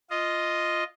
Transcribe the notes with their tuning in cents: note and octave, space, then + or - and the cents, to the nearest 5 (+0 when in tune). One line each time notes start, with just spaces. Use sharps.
F4 -5 D#5 +0